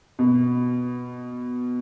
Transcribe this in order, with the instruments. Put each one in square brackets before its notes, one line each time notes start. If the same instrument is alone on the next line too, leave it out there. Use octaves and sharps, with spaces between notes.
[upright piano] B2